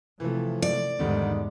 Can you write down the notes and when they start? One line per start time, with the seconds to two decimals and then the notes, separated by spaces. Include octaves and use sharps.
0.20 C3 E3 F3 A3
0.62 D5
0.99 E2 G#2 D3 D#3 G3